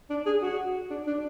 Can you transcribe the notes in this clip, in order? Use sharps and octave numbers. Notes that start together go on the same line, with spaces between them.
D4
G#4
F#4
D4
D4